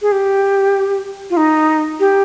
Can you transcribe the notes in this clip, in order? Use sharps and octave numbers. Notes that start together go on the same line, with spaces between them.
G#4
G4
F4
D#4
G4